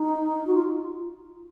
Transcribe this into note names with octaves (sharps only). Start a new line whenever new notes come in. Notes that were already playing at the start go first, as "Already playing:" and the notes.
Already playing: D#4
F#4
F4